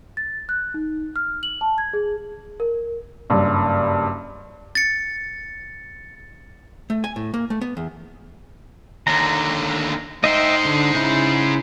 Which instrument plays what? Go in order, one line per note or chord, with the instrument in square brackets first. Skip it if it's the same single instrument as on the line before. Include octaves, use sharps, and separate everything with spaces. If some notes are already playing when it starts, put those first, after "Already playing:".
[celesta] A6
F#6
D#4
F6
F#7
A5
G#6
G#4
A#4
[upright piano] F#1 G2
[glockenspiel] A6 C#7
[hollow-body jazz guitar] A3
G#5
A2
A#3
A3
B3
E2
[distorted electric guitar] D#2 D3 [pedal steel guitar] A#5
[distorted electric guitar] D#4 C5 [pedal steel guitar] D#5 E5 G5
[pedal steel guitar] D3
C#3 E4